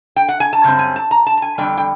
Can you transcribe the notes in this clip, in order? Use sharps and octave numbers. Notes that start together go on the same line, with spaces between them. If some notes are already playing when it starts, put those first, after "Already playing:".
G5
F#5
G#5
A5
F#2 C#3 G3 C4
G#5
A5
A#5
A5
A5
G#5
F2 D3 G3 B3 G5
G5